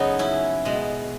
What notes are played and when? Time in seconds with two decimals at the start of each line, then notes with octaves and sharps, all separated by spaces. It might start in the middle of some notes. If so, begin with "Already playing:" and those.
Already playing: F#2 C#3 F#3 B3 D#4 A4 C#5
0.19 C#4 E4
0.65 B2 G#3